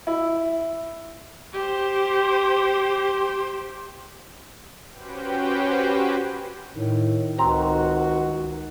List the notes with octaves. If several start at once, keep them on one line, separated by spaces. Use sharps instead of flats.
E4
G4 C5
C#4 F#4 G4 B4 C5 G5
A2 D#3
C#2 C4 F#4 A#5